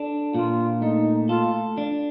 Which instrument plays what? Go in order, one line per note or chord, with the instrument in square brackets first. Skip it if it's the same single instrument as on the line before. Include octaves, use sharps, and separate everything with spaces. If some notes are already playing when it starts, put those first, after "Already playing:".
Already playing: [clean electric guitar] D4 A4
[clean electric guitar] A#2 [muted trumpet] F4
[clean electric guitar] A3 [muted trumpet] D#4
[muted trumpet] F4 [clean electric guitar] A4
[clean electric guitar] D4